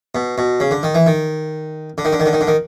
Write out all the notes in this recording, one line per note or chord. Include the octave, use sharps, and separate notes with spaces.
B2
B2
C#3
D3
D#3
E3
D#3
D3
D#3
D3
D#3
D3
D#3
D3
D#3